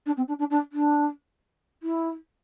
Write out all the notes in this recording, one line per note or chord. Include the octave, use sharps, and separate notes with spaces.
D4
C4
D4
D4
D4
D4
E4